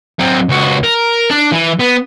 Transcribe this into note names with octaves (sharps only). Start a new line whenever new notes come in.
F#3 C4
C#2 F#4
A#4
D4
E3
B3